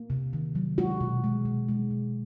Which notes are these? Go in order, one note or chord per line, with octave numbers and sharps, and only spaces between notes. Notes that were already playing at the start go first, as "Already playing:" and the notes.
Already playing: A#3
C3
D#3
F#3
G#3 F#4
B2
G#3
B2
G#3
B2